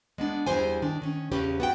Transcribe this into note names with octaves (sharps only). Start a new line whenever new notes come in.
G#3 B3 D4
E2 G#2 G3 E4 C5 G#5
D#3 D4
D#3 C#4
E2 C#3 C#4 G4 B4
B3 F#4 G5